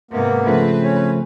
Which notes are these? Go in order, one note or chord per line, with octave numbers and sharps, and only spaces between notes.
G#2 C3 A#3 B3
C#3 F3 A3 C4 B4
C#4 C#5